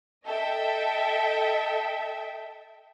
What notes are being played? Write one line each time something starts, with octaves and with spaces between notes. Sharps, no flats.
A4 D#5 E5 G5